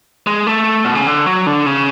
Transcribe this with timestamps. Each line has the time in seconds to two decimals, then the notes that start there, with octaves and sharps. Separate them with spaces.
0.27 G#3
0.47 A3
0.84 B2
0.95 C#3
1.07 D3
1.27 F#3
1.47 D3
1.66 C#3